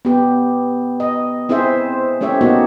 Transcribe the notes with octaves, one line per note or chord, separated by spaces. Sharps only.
B3 G4
D#5
C4 E4 G#4 C5 E5
A3 C#4 G4 C#5 E5
A#3 B3 D#4 F#4 G4